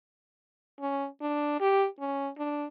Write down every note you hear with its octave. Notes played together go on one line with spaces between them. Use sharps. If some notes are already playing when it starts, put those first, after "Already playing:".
C#4
D4
G4
C#4
D4